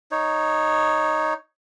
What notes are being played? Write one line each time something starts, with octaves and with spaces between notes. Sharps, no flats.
D#4 C#5